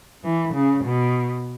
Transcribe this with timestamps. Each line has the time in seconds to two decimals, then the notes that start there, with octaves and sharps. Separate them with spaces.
0.24 E3
0.54 C#3
0.84 B2